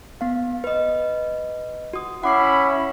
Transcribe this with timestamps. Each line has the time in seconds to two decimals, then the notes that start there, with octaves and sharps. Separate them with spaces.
0.21 B3 F5
0.64 B4 D#5
1.93 F#4 D#6
2.23 C#4 E4 F#5 B5 D6 C7